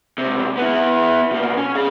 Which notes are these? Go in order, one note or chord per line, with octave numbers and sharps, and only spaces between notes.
C#2 C3
B3 E4
B2 A#3
C#4
G#4 F5